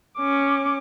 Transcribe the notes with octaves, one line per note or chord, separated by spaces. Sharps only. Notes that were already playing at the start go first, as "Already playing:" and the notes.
C#4 D6